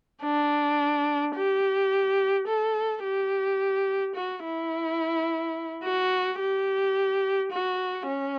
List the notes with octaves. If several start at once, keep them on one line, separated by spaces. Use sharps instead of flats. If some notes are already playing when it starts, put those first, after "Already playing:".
D4
G4
A4
G4
F#4
E4
F#4
G4
F#4
C#4